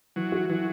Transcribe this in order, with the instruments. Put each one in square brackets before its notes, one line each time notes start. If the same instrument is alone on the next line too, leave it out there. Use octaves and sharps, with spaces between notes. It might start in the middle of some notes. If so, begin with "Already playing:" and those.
[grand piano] E3 [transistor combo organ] F#3
[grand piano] F#4
[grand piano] E3 [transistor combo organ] F#3